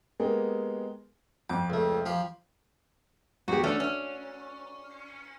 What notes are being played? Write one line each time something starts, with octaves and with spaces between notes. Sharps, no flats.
G#3 A#3 B3 G4 G#4 A#4
F2 D6
C#2 A3
F3 G4 F5
E2 F#4 G4
A3 C#4 D4
C#4